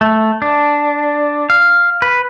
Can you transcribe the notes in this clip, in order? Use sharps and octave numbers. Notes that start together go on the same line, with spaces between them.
A3
D4
F5
B4